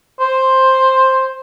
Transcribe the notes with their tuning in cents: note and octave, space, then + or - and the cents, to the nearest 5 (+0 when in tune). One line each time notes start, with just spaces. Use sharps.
C5 +5